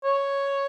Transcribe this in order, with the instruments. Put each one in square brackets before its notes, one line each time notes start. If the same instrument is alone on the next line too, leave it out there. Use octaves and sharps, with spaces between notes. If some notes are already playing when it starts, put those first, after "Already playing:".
[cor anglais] C#5